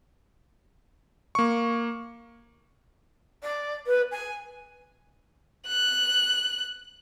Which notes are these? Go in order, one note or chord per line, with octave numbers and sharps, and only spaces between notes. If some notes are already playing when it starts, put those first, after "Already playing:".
A#3 C#6
D5
B4
G#5
F#6